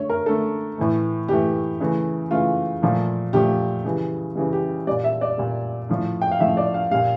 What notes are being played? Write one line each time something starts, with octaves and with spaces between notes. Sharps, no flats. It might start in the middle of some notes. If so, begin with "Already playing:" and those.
Already playing: D3 A3 C#5
A#4
D3 A3 A4
A2 E3 A3
A2 E3 A3 G4
C#3 E3 A3
C#3 E3 A3 F4
A#2 F3 A3
A#2 F3 A3 G4
C#3 E3 G3
C#3 E3 G3
G4
A#2 G3 D5
E5
D5
A#2 G3
A2 F3 A3
G5
F5
A2 F3 A3 E5
D5
F5
A#2 G3 F5